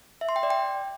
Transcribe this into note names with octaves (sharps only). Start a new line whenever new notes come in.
E5
C6
G5
D5
G5